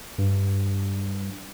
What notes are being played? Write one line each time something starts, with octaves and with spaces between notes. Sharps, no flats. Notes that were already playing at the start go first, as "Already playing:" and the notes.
G2